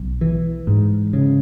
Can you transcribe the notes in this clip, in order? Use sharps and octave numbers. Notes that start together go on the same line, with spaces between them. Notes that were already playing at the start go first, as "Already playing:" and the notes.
Already playing: B1
E3
G#2
C#3